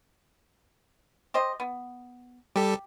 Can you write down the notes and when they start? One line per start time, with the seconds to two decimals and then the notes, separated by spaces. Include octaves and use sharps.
1.34 G4 C5 D#5
1.60 B3
2.56 G3 G4 A4